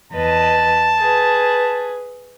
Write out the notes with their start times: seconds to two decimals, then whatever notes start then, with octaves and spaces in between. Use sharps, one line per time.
0.12 E2 B4 D#5 A5
0.98 G#4 B4